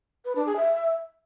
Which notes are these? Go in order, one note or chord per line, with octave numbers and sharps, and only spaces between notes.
B4
D4
G#4
E5